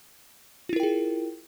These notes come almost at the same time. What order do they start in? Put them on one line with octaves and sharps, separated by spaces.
F4 E4 A#4 G5 G#4